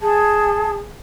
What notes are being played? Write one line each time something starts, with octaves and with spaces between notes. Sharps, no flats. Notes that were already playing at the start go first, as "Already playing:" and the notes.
G#4 A5